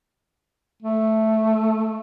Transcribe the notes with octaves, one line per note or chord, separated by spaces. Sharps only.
A3